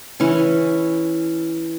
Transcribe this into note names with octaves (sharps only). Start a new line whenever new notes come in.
E3 C#4